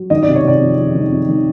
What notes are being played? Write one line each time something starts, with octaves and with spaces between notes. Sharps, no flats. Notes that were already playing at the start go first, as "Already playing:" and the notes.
Already playing: F#3
D#3 D#5
C3 D5
C#5
C3 D5
F2
F2
D#3
F2
D#3